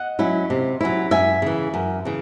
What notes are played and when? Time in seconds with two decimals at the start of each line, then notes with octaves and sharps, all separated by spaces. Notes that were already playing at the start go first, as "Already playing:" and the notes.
Already playing: D#5 F#5
0.19 F#3 C#4 E4
0.50 C3
0.81 F#3 C#4 E4
1.11 F#2 E5 G#5
1.42 C#3 E3
1.74 F#2
2.05 C#3 E3